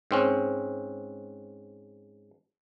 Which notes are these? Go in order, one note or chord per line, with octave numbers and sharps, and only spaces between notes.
G#2 C4 C#4